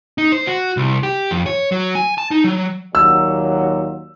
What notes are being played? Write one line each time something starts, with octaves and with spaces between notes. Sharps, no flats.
D#4
C5
F#4
C2
G4
F2
C#5
F#3
G#5
A5
D#4
F#3
D#2 A#2 F#3 E6